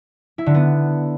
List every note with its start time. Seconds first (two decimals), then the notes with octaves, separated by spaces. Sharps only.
0.38 E4
0.46 D3
0.55 B3